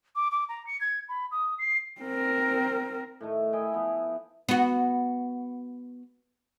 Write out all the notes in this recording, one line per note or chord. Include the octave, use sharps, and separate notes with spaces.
D6
D6
A#5
C#7
G#6
B5
D#6
C7
C4 A#4
A2 D#3 A3
E4 D#5 G5 G#5
F3 B3 E4
B3 F#4